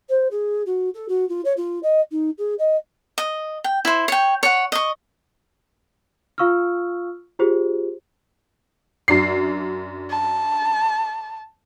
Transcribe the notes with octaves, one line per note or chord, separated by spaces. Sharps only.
C5
G#4
F#4
A4
F#4
F4
C#5
F4
D#5
D#4
G#4
D#5
D#5
G5
E4 C5
C#5 G5
C#5 F#5
D#5 C#6
F4 F5 C#6 E6 F6
F4 G4 G#4 C5
F#2 D4 C7
A5